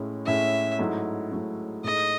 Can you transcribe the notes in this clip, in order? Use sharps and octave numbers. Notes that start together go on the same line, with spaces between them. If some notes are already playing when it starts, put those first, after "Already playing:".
Already playing: A2 G#3 C#4 E4
A2 G#3 C#4 E4 E5
G#2 F#3 A3 E4
G#2 F#3 A3 E4
A2 G#3 D#4 A4 D#5